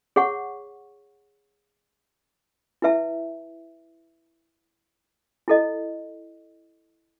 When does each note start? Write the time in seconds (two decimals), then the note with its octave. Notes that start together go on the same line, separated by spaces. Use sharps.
0.16 G#4 C#5 F#5 C#6
2.82 E4 B4 E5 A5
5.48 E4 A4 D#5